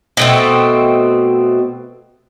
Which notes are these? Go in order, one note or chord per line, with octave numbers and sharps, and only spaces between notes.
B2 A3 C4